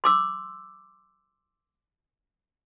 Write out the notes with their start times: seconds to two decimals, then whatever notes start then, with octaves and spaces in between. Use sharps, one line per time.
0.04 C6 D6 E6